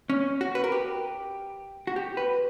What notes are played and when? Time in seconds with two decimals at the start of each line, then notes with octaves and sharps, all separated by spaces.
0.10 C#4
0.41 F#4
0.55 B4
0.64 A#4
0.72 G4
1.87 F#4
1.96 G4
2.17 B4